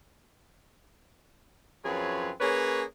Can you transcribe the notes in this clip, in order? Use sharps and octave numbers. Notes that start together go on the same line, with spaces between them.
F#2 F3 C4 G#4 B4 C#5
A#3 C#4 G#4 B4 C#5